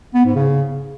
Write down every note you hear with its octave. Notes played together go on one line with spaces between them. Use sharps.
B3
G#2
C#3